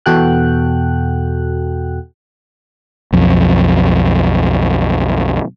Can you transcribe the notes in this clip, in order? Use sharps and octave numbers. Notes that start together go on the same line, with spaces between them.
E2 B2 F#4 A4 G5 F#6
B1 F2